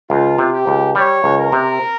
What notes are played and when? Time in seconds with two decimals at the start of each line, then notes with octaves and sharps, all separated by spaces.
0.10 C#2 F4
0.38 C3
0.52 G4
0.67 C#2
0.95 G3 C#5
1.24 C#2
1.38 A#4
1.52 C3